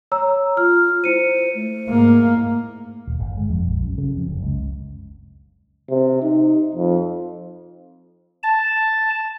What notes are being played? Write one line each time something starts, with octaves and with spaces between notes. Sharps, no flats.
C#5 A#5 E6
F4 F6
E4 C5 C#7 D#7
A3
G#2 A#3
D#1
G1
G#3
F2
A#1
F#2
C#3
F2
F#1
C#2
C3
D#4
F2
A5